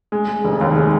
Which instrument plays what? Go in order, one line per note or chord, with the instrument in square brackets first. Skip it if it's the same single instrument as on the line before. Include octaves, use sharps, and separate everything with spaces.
[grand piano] G#3
G#3
F1
D#2
G#3